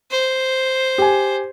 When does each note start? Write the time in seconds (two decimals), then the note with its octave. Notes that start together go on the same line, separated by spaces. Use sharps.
0.11 C5
0.98 G4 G#5